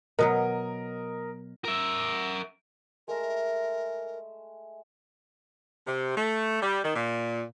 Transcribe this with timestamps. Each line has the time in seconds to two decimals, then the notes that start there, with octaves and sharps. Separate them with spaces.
0.19 B2 F#3 A#4 B4 D#5
1.65 A#4 E5
3.08 G#3 A3 A#4 E5
5.87 C3
6.17 A3
6.62 G3
6.83 D#3
6.96 A#2